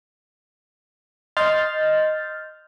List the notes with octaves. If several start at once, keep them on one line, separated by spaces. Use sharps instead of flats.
D#5 C6 F6 G6 A6